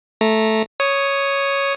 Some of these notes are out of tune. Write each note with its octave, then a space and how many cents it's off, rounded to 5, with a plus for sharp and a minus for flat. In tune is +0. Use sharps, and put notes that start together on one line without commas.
A3 -5 A#5 +0
C#5 +0 D#6 +0